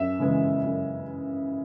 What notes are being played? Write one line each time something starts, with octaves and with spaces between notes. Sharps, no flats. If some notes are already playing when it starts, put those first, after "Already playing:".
Already playing: F#2 E5
C#3 E3 G#3
F#2